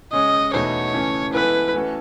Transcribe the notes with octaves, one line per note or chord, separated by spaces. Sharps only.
C#3 G#3 C#4 G#4 C#5 D#5
E2 B2 A3 D#4 F#4 C#5
C#3 E3 A3 C#4
E3 G#3 B3 E4 A4 B4
E3 A3 C#4 F#4 A4